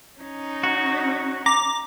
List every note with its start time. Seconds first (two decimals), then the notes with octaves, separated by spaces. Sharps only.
0.20 C#4 D#4
0.63 F#4
1.46 A#5 D6